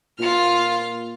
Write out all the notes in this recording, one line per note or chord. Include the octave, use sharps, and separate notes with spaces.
A#2 F4 F6